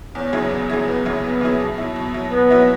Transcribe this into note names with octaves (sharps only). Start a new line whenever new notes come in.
E2 C#4
C#3 F#3 E4 G#4
E2
C#3 F#3 E4 G#4
E2 B3
C#3 F#3 E4 G#4
E2 B3
C#3 F#3 E4 G#4
B2
F#3 E4
B2
F#3 E4
B2 B3
F#3 E4